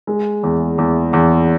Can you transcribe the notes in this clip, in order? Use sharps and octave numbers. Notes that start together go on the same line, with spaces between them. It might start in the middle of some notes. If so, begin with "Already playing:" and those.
G#3
E2
E2
E2